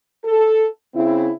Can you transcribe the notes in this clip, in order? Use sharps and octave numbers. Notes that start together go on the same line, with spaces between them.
A4
C#3 C4 E4